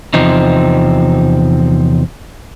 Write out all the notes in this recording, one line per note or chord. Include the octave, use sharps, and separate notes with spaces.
E2 C3 F3 C4 D#4